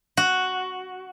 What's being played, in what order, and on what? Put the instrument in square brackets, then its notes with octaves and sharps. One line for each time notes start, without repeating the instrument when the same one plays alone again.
[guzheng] F#4